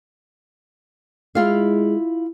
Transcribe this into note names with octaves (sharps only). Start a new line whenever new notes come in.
G#3 E4 F4 F5